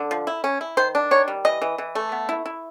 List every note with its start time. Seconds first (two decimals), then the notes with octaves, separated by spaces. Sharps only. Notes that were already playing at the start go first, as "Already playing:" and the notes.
Already playing: D3
0.11 F3
0.27 E4
0.44 C#4
0.61 E4
0.77 D#3 C5
0.95 D4
1.11 D#3 C#5
1.28 G3
1.45 E3 D#5
1.62 E3
1.78 E3
1.95 A3
2.12 B3
2.29 E4
2.46 E4